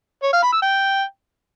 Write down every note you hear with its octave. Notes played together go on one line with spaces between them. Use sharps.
C#5
F5
B5
E6
G5